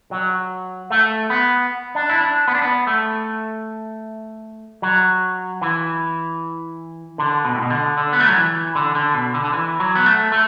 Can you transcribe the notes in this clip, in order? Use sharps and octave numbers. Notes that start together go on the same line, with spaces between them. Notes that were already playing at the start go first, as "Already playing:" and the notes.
F#3
A3
B3
D4
E4
D4
B3
D4
B3
A3
F#3
E3
D3
B2
A2
B2
D3
D3
B3
A3
F#3
E3
D3
D3
B2
D3
D3
E3
F#3
B3
A3
A3